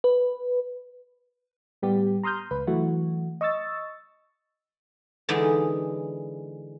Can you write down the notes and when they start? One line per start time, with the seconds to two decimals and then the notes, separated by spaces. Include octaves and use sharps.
0.04 B4
1.82 A2 G3 B3 G4
2.23 A#5 C6 D#6 F6 G6
2.51 C#2 B4
2.67 E3 F#3 A3 F#4
3.41 D#5 C#6 E6 A6
5.29 D3 E3 G#3 D#4